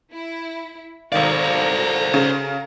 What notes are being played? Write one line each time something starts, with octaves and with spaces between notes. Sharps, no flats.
E4
G#1 D#3 F#4 A4 C5 D5 F5 A#5
C#3